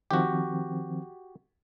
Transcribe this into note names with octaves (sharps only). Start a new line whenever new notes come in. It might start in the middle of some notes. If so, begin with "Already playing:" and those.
D#3 F3 C4 F#4 G4